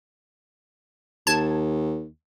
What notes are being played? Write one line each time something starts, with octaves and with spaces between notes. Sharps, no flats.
D#2 A5 G#6